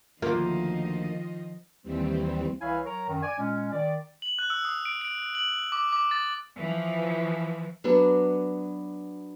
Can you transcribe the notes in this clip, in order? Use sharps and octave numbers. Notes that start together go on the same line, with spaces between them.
D2 D#3 F3 A#3 F4 D#5
D#2 E3 G3 C4
C2 E3 E4 C#5 F5 G#5
F#3 A#4 C#5 A#5
F#2 D#3
D5 G#5
A#2 G#3 C#4
D#3 D5
F#7
F#6
E6
D#6
D7
D7
F#7
D6
D6
A6
E3 F3
F#3 B3 D4